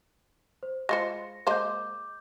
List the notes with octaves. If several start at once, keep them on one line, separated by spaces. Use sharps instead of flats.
C5
G#3 F4 C5 A#6 C#7
G#3 A#3 C5 D6 G6